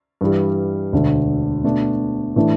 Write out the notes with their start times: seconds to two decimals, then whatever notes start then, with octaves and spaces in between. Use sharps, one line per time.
0.21 G2 E3 G3
0.92 E1 D2 D3
1.64 B2 A3 D4
2.36 A2 E3 A3 D4